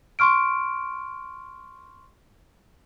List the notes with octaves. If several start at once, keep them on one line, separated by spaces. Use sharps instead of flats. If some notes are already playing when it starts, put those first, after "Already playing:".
C6 C#6 F6 D7